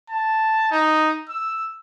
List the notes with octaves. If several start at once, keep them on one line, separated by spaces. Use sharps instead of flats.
A5
D#4
E6